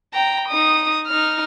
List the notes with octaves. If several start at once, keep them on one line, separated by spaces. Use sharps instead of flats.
G5 A#5
D#4 D#6
D#4 F6